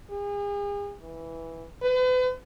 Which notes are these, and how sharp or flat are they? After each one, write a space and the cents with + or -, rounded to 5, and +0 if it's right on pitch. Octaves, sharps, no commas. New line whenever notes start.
G#4 -40
E3 -5
B4 +40